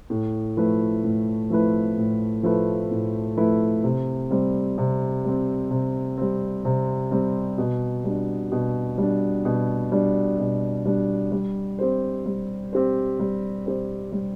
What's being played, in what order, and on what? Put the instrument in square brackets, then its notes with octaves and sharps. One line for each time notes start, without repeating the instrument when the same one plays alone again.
[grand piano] A2
F3 A3 E4 B4
A2
F3 A3 E4 B4
A2
F3 A3 E4 B4
A2
F3 A3 E4 B4
C3
G3 C4
C3
G3 C4
C3
G3 C4
C3
G3 C4
B2
G3 D4
B2
G3 D4
B2
G3 D4
B2
G3 D4
G3
C4 G4 C5
G3
C4 G4 C5
G3
C4 G4 C5
G3